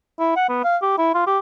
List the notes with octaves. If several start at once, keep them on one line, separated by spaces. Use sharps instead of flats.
E4
F#5
B3
F5
G4
E4
F4
G4